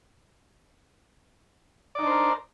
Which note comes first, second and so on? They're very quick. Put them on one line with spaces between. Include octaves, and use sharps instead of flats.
D5 D#4 D4 C5 A#4